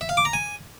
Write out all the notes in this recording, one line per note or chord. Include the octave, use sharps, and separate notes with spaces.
E5
F5
D6
A#5
G#5